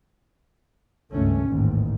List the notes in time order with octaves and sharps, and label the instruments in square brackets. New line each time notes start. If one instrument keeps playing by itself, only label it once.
[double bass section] G#1 C#2 G2 A3 C#4
A1 D#2 G#2 D#3